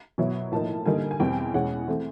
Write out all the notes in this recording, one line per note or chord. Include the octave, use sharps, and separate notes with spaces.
B2 F#3 B3 E4
A2 F3 A#3 D#4 A5
D3 G3 A#3 D#4 G#5
G#5
E2 B2 G3 C4 G5
E2 B2 G#3 C#4 F#5
E3 A3 C4